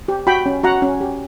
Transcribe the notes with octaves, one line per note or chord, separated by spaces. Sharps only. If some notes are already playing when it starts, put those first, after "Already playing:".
G4
F#4 G5 B5
C#4
F#4 F#5 A#5
C#4
G4